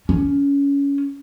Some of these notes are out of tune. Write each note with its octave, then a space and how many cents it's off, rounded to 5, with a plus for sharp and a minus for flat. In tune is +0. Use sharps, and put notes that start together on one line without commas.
C#4 +20